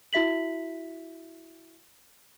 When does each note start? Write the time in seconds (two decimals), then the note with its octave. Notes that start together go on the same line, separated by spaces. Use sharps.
0.13 E4 F#4 E5 B6 F#7